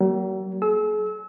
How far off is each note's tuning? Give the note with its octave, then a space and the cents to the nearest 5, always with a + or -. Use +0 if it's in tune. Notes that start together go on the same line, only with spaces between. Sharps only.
F#3 +45 A#3 +0
G#4 +40 E6 -30